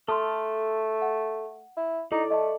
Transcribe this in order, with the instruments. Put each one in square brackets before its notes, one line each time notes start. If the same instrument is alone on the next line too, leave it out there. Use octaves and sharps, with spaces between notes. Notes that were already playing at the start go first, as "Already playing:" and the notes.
[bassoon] A3 [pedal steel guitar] A4 D#6 F6 [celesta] A5 C6
[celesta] F#5
[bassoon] E4
[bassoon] D#4 [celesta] E4 [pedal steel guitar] A4 D5 D6
[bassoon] A3 [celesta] D#5 A5